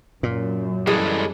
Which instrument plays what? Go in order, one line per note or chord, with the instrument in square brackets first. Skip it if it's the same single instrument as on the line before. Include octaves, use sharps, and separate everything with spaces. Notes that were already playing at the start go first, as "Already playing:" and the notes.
[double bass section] F#2 [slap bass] A#2
[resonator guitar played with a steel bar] E3 G#4 [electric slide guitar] G3 G#3 A4